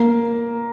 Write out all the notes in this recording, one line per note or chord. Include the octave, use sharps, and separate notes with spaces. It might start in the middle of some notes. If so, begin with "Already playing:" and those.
Already playing: A#3